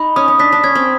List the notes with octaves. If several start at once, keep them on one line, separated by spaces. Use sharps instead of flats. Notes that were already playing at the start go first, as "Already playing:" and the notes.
Already playing: D#4 B5
C#4 D#6
C#4
D4 B6
D4
C#4 G#6
C4